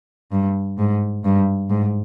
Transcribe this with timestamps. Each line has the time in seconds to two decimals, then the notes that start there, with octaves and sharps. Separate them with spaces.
0.32 G2
0.78 G#2
1.24 G2
1.70 G#2